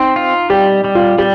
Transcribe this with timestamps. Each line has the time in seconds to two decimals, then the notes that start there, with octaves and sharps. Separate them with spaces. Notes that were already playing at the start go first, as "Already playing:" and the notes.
Already playing: C4 D#4
0.16 F4
0.50 G3 G4
0.84 G3
0.95 F4
1.18 G3 G4